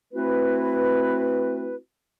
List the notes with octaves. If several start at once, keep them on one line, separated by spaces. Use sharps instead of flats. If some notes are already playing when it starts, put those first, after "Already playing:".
A3 C4 E4 F#4 B4